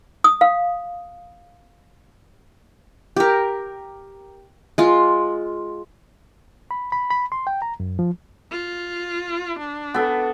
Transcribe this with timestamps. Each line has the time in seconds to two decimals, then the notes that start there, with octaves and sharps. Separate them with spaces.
0.24 D#6
0.41 F5
3.16 G4 A#4
4.78 G#3 F4
6.71 B5
6.92 B5
7.11 B5
7.32 C6
7.47 G5
7.62 A#5
7.80 F#2
7.99 F3
8.52 F4
9.59 D4
9.94 B3 A4